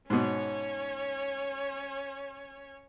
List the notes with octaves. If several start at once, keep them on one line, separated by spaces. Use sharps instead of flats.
G#2 B2 C#4 C#5